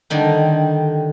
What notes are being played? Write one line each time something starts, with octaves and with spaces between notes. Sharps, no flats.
D3 D#3 G3